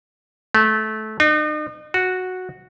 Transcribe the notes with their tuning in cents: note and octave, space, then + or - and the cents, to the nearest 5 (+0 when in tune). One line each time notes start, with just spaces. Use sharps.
A3 -20
D#4 -40
F#4 -5